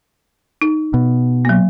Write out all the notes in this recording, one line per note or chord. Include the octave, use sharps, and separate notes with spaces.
D#4
B2
F#3 A#3